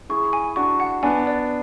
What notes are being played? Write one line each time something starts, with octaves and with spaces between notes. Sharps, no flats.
E4 G#4 C#6
G#5
D4 F#4 C#6
F#5
B3 D4 G#5
D5